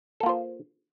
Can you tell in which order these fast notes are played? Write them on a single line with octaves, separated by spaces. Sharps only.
A4 A#3 F4 C5